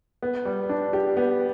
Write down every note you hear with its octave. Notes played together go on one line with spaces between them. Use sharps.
B3
G3
D4
G4
B3